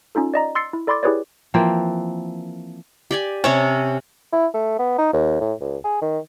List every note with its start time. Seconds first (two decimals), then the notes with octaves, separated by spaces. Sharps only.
0.15 C#4 D#4 F4 A4
0.34 D5 D#5 A#5
0.55 C6 E6 A6 C7 C#7
0.73 E4
0.87 A4 D5 B5 C6 D6 A6
1.03 E4 G4 G#4 B4 C#5 D5
1.54 E3 F3 A#3 C4
3.11 G4 D5 G#5
3.44 C3 C#4 C#5 A5
4.32 E4
4.54 A3
4.79 B3
4.98 D#4
5.13 D#2
5.41 A2
5.61 C#2
5.84 G#4
6.02 D#3